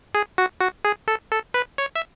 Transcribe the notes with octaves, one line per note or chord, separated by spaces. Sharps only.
G#4
F#4
F#4
G#4
A4
A4
B4
C#5
E5